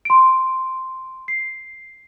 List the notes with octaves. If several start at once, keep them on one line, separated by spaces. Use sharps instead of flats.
C6 D7
C7